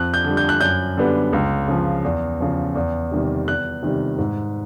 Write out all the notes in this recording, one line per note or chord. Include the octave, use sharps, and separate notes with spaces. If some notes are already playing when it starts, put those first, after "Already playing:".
Already playing: F2 F#6
G6
D3 G3
G6
F#6
F#2 G6
D3 G3 B3 D4
C#2
C#3 F3
E2
C#3 F3
E2
C3 D#3 G3
E2 F#6
C3 D#3 G3
G#2